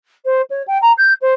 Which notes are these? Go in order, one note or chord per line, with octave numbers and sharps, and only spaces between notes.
C5
C#5
G5
A#5
G6
C5